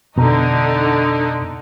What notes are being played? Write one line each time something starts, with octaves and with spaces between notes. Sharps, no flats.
F2 B2 D3 D#4 A#5